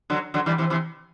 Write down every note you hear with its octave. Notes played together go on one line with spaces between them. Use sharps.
D3 F#3
D3 F#3
E3 G3
C3 E3
C3 E3